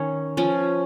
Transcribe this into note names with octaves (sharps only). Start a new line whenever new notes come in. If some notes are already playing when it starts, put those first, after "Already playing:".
Already playing: D#3 C#4 C#5
F3 C#4